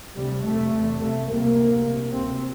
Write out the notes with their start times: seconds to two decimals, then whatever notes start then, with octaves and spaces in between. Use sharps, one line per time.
0.15 D2 C3 G3
0.43 F2 C3 A3
0.72 E2 C3
0.99 C2 C3 A3
1.28 C2 C3 A#3
1.56 D2 C3
1.84 C2 C3
2.12 D2 C3 C4